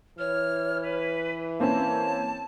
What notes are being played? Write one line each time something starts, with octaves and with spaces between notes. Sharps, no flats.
E3 C#5 F6
B4
A#3 C4 C#4 C#5 A5